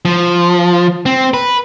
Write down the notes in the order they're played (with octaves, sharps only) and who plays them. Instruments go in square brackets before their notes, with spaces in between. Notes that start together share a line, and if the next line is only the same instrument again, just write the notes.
[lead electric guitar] F3
C4
B4